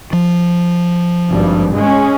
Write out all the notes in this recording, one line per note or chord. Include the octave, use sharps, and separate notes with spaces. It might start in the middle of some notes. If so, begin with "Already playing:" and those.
F3
G#1 G2
G#3 C#4